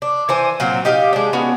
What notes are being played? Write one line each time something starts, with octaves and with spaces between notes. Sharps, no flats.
D4
E3 C5 G#5
A#2 F#3 C4
D#4 G4 F5
G#3 D4
B3 C#4 F#4